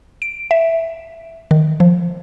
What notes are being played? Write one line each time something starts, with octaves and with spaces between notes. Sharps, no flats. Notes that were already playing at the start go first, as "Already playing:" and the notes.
D7
E5
D#3
F3